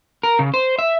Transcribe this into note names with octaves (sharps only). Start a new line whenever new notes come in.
A#4
C#3
C5
E5